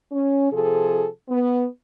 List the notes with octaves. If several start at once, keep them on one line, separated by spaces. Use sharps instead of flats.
C#4
C3 F3 G#4 A4
B3